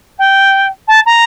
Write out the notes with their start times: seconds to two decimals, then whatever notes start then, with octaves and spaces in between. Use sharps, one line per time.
0.18 G5
0.88 A5
1.06 A#5